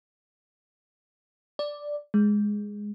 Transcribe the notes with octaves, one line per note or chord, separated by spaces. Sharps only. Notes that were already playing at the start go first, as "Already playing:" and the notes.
D5
G#3